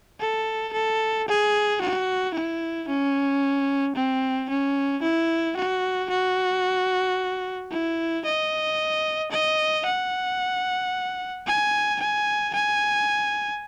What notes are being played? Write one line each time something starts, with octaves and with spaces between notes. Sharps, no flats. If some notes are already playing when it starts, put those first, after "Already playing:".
A4
A4
G#4
F#4
E4
C#4
C4
C#4
E4
F#4
F#4
E4
D#5
D#5
F#5
G#5
G#5
G#5